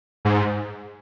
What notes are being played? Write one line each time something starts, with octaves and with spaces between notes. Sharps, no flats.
G#2